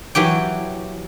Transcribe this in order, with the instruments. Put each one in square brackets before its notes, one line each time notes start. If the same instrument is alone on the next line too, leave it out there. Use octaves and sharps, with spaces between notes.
[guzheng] E3 F#3 G4 G5